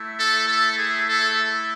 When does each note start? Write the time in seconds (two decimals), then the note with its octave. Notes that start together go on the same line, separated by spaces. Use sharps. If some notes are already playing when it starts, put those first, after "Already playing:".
Already playing: A3 E4
0.17 A4
0.47 A4
0.75 G#4
1.05 A4